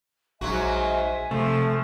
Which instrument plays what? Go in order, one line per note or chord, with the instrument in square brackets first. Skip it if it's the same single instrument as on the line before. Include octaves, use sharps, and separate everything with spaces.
[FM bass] A#1 [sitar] G#2 F#3 F#4 [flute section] E5 G#5
[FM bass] C3 [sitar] F3 [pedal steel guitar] A3